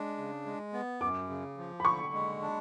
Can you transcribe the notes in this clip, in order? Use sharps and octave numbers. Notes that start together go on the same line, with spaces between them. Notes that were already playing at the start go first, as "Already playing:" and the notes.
Already playing: G#3 D4
C#3
G#3
B3
F#2 D6
C#3
F3
B5
D3 C#6
G#3
D4